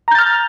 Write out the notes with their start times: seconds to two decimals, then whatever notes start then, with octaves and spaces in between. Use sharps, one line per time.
0.08 A#5
0.11 G6
0.15 A6
0.19 F6